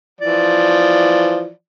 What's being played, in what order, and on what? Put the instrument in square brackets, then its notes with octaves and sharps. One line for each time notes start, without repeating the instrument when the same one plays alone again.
[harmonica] E3 F3 D5